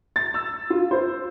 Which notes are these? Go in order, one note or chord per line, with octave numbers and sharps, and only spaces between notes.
A6
E6
F4
C5